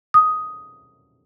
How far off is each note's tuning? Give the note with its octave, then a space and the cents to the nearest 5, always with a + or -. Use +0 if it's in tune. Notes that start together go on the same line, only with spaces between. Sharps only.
D#6 +5